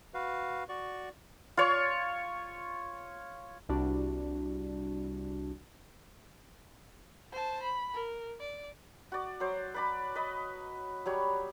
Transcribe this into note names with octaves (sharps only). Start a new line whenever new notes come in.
F#4 B4 F5
F#4 D5 C#6
F4 C#5
C2 G3 D4 F#4
C5 A5
B5
A#4
D5
F#4 D5
F#3 C5
B4 D5 B5
B4 D#5
F#3 G3 C#5